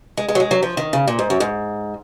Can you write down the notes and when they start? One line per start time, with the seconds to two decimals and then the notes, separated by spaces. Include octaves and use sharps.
0.17 G#3
0.28 G#3
0.35 F#3
0.40 G#3
0.51 F#3
0.63 F3
0.77 D#3
0.93 C#3
1.08 A#2
1.19 G#2
1.30 F#2
1.40 G#2